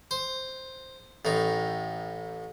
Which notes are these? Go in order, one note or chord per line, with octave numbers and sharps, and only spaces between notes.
C5
A1 A2 D#4